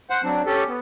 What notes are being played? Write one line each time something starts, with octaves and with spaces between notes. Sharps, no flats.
C5 F#5
F#3 C4 D4
C#4 G4 A4
B3